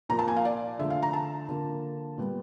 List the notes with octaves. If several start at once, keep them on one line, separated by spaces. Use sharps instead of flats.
A#2 F3 A#3 A#5
A5
G#5
F5
D5
D3 F3 A3 E5
F5
A#5
A5
D3 F3 A#3
A#2 G3 B3